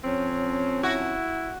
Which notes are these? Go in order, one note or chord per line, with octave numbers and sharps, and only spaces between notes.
F2 C4 C#4
E4 F#4